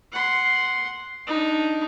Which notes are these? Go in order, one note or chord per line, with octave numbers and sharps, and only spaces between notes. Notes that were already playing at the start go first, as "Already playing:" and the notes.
F#5 C6
D4 D#4